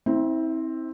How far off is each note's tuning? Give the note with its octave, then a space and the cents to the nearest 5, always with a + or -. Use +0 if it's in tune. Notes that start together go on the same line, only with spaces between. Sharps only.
C4 +10 E4 -40 E5 +0